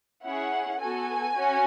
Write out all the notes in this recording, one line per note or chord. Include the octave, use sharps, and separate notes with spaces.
C#4 E4 G#4 F#5
B3 F#4 A4 G#5
C#4 F#4